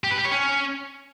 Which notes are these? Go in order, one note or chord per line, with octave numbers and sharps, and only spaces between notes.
G4
B4
G4
C#5
C#4